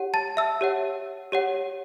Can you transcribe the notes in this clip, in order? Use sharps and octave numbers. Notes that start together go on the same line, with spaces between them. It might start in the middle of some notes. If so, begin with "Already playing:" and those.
Already playing: G4 C#5 F#5
A5 A6
E5 E6
G4 C#5 F#5
G4 C#5 F#5